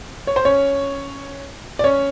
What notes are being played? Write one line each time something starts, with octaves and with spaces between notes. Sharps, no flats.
C#5
C5
C#4 C#5
D5
C#4 C#5